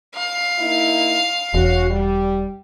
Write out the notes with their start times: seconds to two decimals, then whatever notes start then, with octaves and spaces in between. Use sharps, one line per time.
0.15 F5
0.59 A#3 D#4 E4
1.54 E1 C#4 F#4
1.90 G3